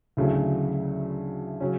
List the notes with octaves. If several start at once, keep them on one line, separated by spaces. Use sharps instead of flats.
D2 C#3 F#3 A3 E4
C#3 F#3 C#4